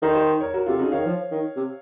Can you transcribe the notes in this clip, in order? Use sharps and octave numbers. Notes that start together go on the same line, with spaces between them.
D#3 A4 C5
C5 D#5
A#4 C#5
F#4 A#4
C3 F4 A4
C#3 D#4 F#4
D#3 C#5 F5
F3
D#3
C3